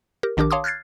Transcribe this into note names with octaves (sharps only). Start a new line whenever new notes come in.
G4 A#4
A#1 D#3 D4 G4 A#4 D6
C#5 F5 A5 C6 D6 D#6
F6 F#6 G#6 A6 C7